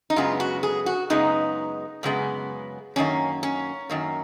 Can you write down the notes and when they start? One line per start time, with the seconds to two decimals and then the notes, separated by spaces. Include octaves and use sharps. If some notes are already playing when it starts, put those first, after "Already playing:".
0.10 D#4
0.16 F#2 C#3 G#3 B3 F4
0.40 F#4
0.63 G#4
0.86 F#4
1.10 F#2 C#3 G#3 B3 D#4
2.03 F#2 C#3 G#3 B3
2.96 F#2 D#3 A#3 C#4
3.43 C#4
3.90 F#2 D#3 A#3